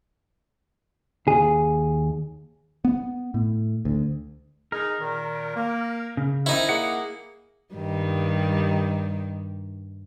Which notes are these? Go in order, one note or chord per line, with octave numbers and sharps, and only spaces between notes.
D#2 G#4
B3
A2
D2
D#4 G#4 A#4
A#2 D#3
A#3
C#3
C4 D#4 E4 A#4 C#5
A#3 G#4 F#5
G2 D#3 G3